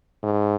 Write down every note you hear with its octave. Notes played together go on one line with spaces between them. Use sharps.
G#2